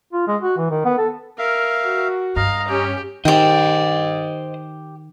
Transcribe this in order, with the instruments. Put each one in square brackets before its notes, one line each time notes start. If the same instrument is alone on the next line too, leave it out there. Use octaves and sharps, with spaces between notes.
[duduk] F4
G#3
F#4
E3
D#3
B3
A4
[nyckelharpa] A#4 [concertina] E5 F5
[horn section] F#4
[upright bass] G2 [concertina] D#5 A#5 [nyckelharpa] F5
[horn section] C#4 [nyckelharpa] G4
[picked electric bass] D#3 [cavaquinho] G4 G5 [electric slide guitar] C5 D#5